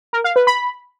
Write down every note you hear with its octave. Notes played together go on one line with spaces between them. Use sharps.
A#4
F5
B4
B5